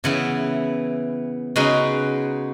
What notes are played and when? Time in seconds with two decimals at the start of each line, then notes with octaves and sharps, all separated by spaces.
0.04 C#3 E3 B3 E4
1.56 C#3 G#3 D#4 F#4 B4